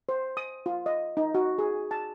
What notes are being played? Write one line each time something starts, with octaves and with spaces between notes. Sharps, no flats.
C5
D#6
F4
D#5
D#4
F#4
G#4
A5